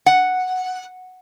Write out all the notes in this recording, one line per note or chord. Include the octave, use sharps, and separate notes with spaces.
F#5